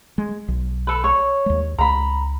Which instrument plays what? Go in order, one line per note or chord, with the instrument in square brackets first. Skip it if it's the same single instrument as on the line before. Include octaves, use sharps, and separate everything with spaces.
[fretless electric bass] G#3
B1
[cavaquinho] A4 B4
C#5
[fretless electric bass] D#2 G#3
[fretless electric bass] C#2 [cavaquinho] A#5 B5